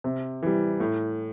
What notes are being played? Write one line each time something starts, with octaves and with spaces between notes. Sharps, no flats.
C3
E3 G3
A2